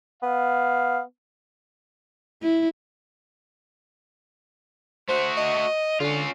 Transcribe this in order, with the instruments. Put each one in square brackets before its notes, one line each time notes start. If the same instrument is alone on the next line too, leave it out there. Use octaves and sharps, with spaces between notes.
[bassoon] B3 [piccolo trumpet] F5
[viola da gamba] E4
[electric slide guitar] A3 F#4 [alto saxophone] C5
[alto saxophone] D#5
[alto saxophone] D3 [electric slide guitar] C#4 F4